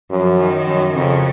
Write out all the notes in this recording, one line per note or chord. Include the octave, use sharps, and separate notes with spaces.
F#2 F3
D#3
F#2
F2 C#3